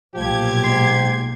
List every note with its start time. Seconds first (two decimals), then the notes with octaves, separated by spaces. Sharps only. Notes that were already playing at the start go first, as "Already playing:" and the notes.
0.14 B1 A#2 F3 G4 G#6
0.64 G#2 C6